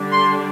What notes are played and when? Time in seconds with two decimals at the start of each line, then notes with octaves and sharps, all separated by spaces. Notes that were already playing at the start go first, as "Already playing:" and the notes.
Already playing: D3 G3 D4
0.11 C6